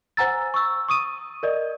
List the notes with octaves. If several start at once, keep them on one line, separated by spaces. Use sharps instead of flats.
C5 F#5 G#5 A#5 E6 A6
C#6 E6
C#6 D#6 D#7
A#4 D5 D#5